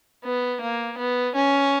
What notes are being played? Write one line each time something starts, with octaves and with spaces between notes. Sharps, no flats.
B3
A#3
B3
C#4